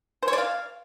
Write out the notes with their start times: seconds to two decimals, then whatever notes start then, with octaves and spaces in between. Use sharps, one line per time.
0.23 C5
0.28 C#5
0.33 D5
0.38 F5